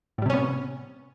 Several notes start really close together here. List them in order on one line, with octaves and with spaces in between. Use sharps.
A2 G3 C3 C#4 B3